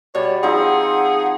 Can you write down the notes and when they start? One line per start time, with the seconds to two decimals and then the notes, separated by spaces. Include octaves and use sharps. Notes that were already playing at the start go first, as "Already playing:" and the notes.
0.15 B2 G3 C#5 D5
0.43 F3 C4 D#4 G#4 F#5